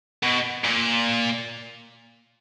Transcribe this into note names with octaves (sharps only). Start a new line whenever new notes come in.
B2
A#2